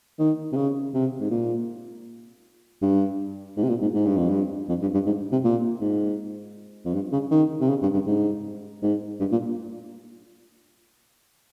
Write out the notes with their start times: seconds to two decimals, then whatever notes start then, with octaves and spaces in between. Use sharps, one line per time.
0.19 D#3
0.52 C3
0.56 C#3
0.94 C3
1.20 G#2
1.31 A#2
2.82 G2
3.57 G#2
3.63 C3
3.69 A#2
3.82 G#2
3.94 G#2
4.06 G2
4.17 F2
4.29 G2
4.69 F2
4.82 G2
4.94 G2
5.06 G#2
5.32 C3
5.44 A#2
5.81 G#2
6.85 F2
6.94 G2
7.12 C#3
7.31 D#3
7.61 C3
7.69 C#3
7.82 G2
7.93 G2
8.06 G#2
8.82 G#2
9.20 G2
9.32 A#2